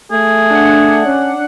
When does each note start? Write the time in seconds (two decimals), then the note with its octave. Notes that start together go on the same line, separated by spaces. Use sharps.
0.12 A3 G#4
0.51 D4 F#5
1.06 C#4